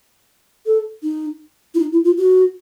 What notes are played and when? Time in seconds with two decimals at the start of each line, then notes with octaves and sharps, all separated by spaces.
0.66 A4
1.03 D#4
1.75 E4
1.79 D#4
1.92 E4
2.04 F4
2.18 F#4